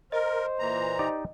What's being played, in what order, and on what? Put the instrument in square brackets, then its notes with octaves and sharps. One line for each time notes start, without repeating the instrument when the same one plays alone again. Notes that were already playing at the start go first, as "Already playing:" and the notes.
[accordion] A#4 [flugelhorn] C5 [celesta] D#5
[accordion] A#2 E3 A#5
[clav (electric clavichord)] D#4 G4 D5